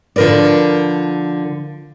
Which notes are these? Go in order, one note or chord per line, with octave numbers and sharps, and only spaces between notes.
D3 F3 A#4 B4 D5